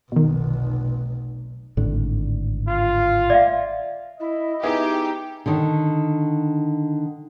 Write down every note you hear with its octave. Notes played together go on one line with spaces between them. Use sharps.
F1 B1 B2 D#3
G#1 A2 D3
F4
D5 E5 F5
E4 D#5
B3 D#4 E4 G4 G#4
D3 D#3